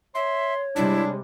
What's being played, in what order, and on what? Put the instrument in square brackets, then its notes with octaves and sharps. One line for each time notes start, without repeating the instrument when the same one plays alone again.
[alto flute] C#5 [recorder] E5 [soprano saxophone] C6
[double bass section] C3 G3 G#3 [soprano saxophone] D4 [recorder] E4